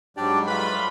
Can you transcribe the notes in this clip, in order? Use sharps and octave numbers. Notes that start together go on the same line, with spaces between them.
G#2 F#3 G3 D4 G4 D5
A3 F4 B4 B5